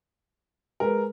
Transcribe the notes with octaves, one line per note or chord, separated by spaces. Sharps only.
G#3 A#4 B4